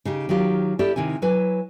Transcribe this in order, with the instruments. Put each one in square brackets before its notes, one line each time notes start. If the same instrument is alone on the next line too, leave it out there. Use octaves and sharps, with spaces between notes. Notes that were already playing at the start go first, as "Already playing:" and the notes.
[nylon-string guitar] C#3 D#4 G4
D#3 F#3 F4 G4
E4 G4 A4 D5
C3 D#3 E4 G#5
F#3 E4 B4 G#5